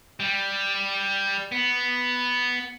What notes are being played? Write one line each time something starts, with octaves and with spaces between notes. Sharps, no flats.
G3
B3